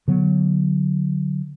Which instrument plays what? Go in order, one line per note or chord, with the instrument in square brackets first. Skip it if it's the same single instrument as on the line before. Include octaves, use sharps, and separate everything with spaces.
[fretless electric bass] D3 F#3 B3